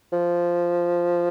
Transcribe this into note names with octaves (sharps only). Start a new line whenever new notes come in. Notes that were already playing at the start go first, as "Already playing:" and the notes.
F3